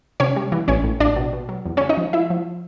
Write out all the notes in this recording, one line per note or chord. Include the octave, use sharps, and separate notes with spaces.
C3 C#4 C#5
G3
E3
A1 C#4 C#5
A2
A1 D4 D5
B2
B2
F#3
E2
C#3 C#4 C#5
D#4 D#5
F3
F3 E4 E5
F3